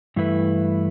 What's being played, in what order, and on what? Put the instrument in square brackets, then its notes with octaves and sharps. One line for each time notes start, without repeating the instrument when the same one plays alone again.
[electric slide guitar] G2 E3 A3 E4 B4